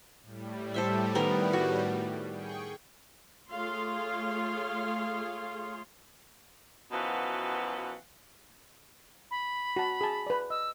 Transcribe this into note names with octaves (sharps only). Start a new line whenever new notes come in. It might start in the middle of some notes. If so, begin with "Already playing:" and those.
A2 G3
A4 C5 E5
D#3 B3 A#4
F#4
G#4 G5 C#6
A3 F4 G#4 C#5 F5 C6
F#2 B2 E3 F3 F5 F#5
B5
F#4 A5
G#4 A5
B4 D5
D#5 E6